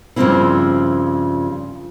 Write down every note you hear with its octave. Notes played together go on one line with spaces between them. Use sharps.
G2 C#3 F3 A#3 C4 E4